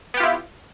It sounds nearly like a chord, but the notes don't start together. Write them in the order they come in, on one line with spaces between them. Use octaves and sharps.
B3 G4 F4 E4